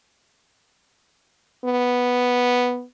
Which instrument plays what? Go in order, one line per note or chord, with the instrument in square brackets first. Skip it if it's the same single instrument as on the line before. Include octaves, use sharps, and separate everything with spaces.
[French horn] B3